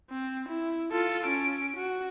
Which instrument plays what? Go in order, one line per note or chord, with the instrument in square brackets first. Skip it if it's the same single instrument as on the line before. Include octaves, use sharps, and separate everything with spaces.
[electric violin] C4
E4
F4 A4
C#4 D7
F#4